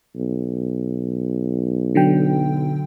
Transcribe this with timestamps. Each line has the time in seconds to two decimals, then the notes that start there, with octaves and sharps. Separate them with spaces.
0.16 B1
1.95 D3 F#3 G5